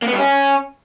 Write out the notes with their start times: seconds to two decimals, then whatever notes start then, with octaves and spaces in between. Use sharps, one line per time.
0.02 A#3
0.08 B3
0.13 G3
0.18 C#4